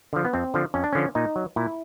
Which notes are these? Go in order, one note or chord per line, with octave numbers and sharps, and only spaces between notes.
D3 F3
B3
F2 C4
D3 F3
F2 C#4
D4
D3 F3 C#4
A#2 D#4
F#3
A#2 E4